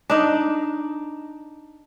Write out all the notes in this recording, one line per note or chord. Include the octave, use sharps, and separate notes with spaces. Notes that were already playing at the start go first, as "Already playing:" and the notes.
D4 D#4